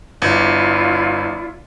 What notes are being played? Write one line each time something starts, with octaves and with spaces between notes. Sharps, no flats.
G1 E4 F4 D5